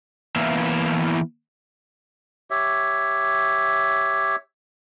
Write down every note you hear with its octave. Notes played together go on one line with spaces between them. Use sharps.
E3 A#3 B3 E4 E5 F5
G4 C#5 E5